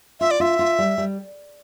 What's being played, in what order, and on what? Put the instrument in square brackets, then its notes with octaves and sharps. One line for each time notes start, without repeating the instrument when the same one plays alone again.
[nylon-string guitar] F4 [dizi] E5
[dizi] D5
[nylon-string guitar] F4 [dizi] E5
[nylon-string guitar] F4
G3
G3